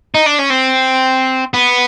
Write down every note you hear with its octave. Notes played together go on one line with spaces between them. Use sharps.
D#4
D4
C#4
C4
B3